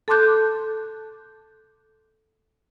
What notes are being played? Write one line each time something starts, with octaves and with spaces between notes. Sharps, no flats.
A4 A5 C6 D6 F#6 G6